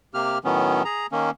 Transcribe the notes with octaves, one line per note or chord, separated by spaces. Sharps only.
C3 A#3 G4 F6
A2 D#3 F#3 B3 C#4
G#4 A#5
D#3 A#3 C#4